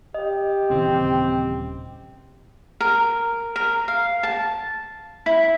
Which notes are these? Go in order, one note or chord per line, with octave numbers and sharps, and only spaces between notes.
G4 D#5
D#1 C#3 E3 C4
A#4
A#4
F5
A5
E4